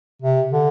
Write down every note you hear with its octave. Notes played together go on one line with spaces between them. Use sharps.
C3
D3